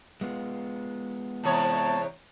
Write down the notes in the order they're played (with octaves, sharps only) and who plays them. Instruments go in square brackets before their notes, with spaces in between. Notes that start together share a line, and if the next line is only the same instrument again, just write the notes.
[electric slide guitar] G#3 B3 F4
[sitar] E2 C3 C#5 [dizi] A5